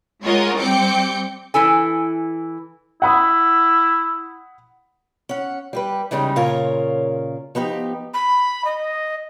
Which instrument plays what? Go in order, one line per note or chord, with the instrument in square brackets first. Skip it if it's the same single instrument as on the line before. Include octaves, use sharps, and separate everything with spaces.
[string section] G#3 F4 A#4 C#5 D#5 F#5
G3 C4 G5 D6 G6 C#7
[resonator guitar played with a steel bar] E3 E4 A4 G#5
[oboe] E4 [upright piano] F#5 B5 D#6
[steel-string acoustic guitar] C#4 F#5
G3 G4 B4
E2 C#3 G3 G#3 D#4
A#2 C#3 F4 A#4 C#5
F3 B3 D#4 G4
[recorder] B5
D#5